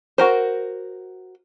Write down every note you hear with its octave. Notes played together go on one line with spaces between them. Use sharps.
F#4 A#4 C5